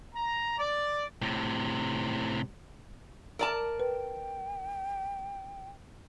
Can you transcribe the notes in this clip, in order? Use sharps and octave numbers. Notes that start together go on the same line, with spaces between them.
A#5
D5
A2 C3
A#4 D5 A5
B4 G5